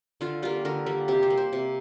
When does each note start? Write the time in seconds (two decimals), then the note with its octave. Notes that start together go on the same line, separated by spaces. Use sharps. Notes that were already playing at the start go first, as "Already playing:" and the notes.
0.21 D3 F4
0.42 G3 A#3 F4
0.65 D3 A#4
0.86 G3 A#3
1.08 C3 G4
1.23 C5
1.30 A#3
1.37 C5
1.53 C3